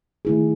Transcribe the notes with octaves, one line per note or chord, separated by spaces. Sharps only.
D#3 A3 E4 G#4